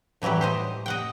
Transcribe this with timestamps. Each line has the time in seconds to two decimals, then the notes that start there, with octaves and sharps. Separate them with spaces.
0.22 A2 E3 F#3 G3 G4
0.41 G4 C5 D#5
0.86 D#5 F#5 G5